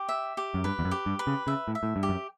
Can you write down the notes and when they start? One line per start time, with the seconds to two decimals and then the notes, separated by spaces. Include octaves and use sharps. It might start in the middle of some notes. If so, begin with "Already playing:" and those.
Already playing: G4
0.09 E5
0.37 G4
0.54 F#2
0.64 G2 B4
0.79 E2
0.85 F#2
0.91 G4
1.06 G2
1.19 B4
1.27 C#3
1.47 C#3 E5
1.68 A2
1.75 E5
1.83 A2
1.96 G2
2.03 G4
2.09 F#2